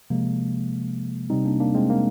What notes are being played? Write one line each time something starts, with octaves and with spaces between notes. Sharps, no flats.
C3 F3 G#3 A#3
C3 G3 C4 D#4
A#3 D4
A#3 D4
G#3 C4
A#3